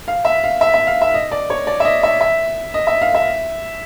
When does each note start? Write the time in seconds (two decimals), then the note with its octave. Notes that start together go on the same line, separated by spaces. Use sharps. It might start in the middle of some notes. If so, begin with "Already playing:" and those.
0.08 F5
0.25 E5
0.44 F5
0.61 E5
0.74 E5
0.87 F5
1.02 E5
1.14 D#5
1.31 D5
1.50 C#5
1.67 D5
1.80 E5
1.85 D#5
2.03 E5
2.21 E5
2.74 D#5
2.87 E5
3.01 F5
3.15 E5